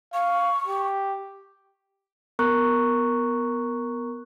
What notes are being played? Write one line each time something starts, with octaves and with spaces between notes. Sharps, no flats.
F5 C#6
G4
B3 A#4 A#5 C#6 F#6